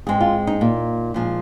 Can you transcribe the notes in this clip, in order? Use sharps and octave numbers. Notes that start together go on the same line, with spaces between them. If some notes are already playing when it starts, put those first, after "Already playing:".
G#2 G#3 C4 G#4
F4
D#4
A#2 A#3
A#2 F3 G#3